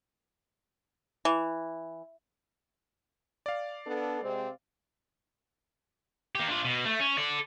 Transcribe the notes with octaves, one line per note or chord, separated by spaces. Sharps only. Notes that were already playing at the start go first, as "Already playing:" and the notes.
E3
D5 F5
B3 D4 A4
C3 G#3 C4
A#3 G4
D4 F4
B2
A3
C#4
A4 D5